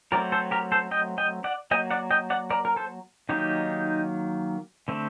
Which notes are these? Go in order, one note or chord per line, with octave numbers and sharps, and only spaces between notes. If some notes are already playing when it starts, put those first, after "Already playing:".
F#3 A3 C4 A#4 D5
A4 C5
G4 A#4
A4 C5
D#5 G5
D#5 G5
D5 F#5
F#3 A#3 D#5 G5
D5 F#5
D#5 G5
D5 F#5
A#4 D5
A#4
A4 C5
D#3 F#3 A#3 D#4 G4
D3 A3 C4